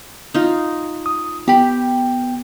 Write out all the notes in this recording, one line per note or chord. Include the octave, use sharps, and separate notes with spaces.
D#4 F4
D#6
B3 G4 G5 B5